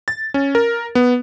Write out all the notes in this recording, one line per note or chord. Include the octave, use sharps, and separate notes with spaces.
A6
C#4
A#4
B3